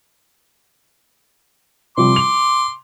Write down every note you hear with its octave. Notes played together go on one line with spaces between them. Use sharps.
C3 F3 G3 C6 D6
F7